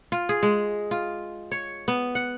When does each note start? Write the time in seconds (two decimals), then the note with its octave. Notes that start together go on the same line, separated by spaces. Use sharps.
0.12 F4
0.29 G#4
0.43 G#3
0.91 F4
1.51 C#5
1.88 B3
2.15 F#5